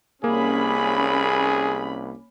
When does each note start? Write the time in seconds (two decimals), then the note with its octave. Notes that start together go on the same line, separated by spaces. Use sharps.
0.24 C2 A#3 C#4 G#4 B5